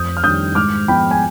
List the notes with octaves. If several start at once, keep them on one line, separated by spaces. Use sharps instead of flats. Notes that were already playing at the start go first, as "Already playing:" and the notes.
Already playing: F2 D#6 G6
F6
D#3 G3 D4 D#6 G6
G#2 D6 F6
F3 G#3 B3 G5 B5
G#5